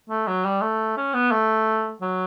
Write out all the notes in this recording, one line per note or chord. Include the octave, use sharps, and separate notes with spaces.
A3
F#3
G3
A3
C#4
B3
A3
F#3